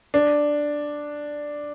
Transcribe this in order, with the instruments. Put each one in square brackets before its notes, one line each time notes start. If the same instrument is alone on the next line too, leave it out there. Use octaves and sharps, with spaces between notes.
[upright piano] D4